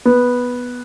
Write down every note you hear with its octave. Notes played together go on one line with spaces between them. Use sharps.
B3